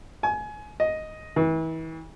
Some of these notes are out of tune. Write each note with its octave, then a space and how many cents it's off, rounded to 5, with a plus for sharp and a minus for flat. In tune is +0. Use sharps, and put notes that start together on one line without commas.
G#5 +25
D#5 +5
E3 -35